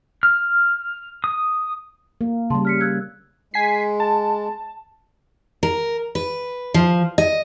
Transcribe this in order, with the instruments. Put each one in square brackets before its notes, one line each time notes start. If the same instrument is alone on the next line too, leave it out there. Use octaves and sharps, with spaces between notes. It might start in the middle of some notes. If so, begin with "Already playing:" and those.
[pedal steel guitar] F6
D#6
[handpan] A#3
[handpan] C#3 G3 [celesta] A5 C6
[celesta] F6 B6 C#7
E6 F#6 G#6
[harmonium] G#3 [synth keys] G#5 B6 C7
[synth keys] A5
[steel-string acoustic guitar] A#4
B4
F3
D#5